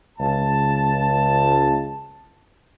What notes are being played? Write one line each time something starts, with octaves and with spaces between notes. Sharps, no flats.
C#2 A5